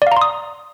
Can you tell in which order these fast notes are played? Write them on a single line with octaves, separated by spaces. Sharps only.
D5 F5 A#5 C6 D#6